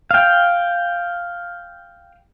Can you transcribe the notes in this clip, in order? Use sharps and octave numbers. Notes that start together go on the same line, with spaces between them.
F5 G5